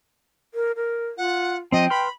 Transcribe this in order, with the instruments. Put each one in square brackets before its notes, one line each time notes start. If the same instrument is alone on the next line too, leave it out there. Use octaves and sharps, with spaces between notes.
[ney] A#4
A#4
[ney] F4 [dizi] F#5
[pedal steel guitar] F3 C4 [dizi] D#5 [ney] G5
[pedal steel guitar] B4 C6 F6 [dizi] B5